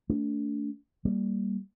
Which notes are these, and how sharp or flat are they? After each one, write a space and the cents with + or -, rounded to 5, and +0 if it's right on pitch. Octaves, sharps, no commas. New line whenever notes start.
A3 +5 D4 -30
G3 +0 A#3 +0